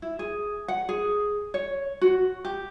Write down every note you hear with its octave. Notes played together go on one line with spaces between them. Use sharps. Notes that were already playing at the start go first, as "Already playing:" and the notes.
E4
G#4
F#5
G#4
C#5
F#4
G4